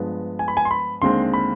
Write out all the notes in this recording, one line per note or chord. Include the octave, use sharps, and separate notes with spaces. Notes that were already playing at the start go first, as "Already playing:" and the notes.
Already playing: G2 F3 G#3 B3
G#5
B5
G#5
C6
B5
D#2 D3 G#3 C4 C6
B5